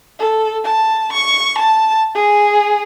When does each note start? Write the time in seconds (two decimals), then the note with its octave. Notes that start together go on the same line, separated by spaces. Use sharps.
0.19 A4
0.64 A5
1.13 C#6
1.59 A5
2.14 G#4